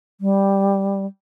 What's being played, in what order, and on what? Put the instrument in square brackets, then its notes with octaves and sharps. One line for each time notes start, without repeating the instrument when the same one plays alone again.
[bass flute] G3